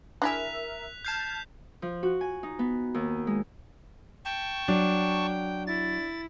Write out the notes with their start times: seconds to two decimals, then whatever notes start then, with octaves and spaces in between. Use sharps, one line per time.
0.22 D4 E4 G#4 A#4 E5 F#6 B6 F7
1.05 A5 F6 G6 G#6 C7 E7
1.82 F3
2.03 F#4
2.21 G#5
2.43 D#4
2.59 B3
2.94 D#2
3.27 G#3
4.25 G5 A5 C#6
4.68 F#3 D4
5.67 E4 A6